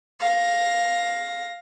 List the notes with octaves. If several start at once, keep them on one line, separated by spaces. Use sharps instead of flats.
F5 A#6